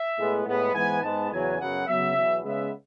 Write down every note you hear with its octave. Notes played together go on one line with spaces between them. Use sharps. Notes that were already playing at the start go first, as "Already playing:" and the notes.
Already playing: E5
A2 G#3 B3
A2 G#3 B3
G#2 E3 B3 G#5
G#2 G#3 B3 A5
E2 C#3 F#3 G#5
F#2 C#3 F#3 B3 F#5
C#3 F#3 B3 E5
E2 B2 F#3
C#3 G#3 B3 E5